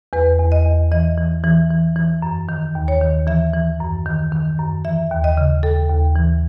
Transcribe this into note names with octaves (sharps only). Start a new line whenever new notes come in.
E2 B4
E2
D#5
E2
E3 D#5
E3
E3
E3
E3
F#2
D#3
D#2
C#5
D#3
E3 E5
E3
F#2
D#3
D#3
F#2
E3 E5
D#2
D#5
C#3
D#2 A4
D#2
E3